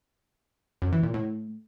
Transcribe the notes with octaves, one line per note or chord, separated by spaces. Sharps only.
F#2
E3
A#2
A2